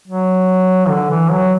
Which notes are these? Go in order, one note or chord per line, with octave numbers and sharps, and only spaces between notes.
F#3
D3
E3
F#3